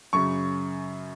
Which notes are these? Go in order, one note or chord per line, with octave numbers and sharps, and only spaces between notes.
F#2 C#3 C#6